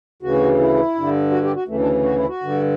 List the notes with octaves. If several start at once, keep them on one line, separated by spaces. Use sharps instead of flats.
D2 C#3 E3 F#4
E4
G2 D3
F#4
G4
F#4
D2 C#3 E3 A3
D4
F#4
E4
F#4
G2 D3